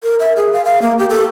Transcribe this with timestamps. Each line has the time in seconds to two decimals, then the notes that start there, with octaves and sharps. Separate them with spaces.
0.03 A#4
0.20 E5
0.37 G#4
0.53 F5
0.65 F5
0.82 A#3
0.98 G4
1.10 A4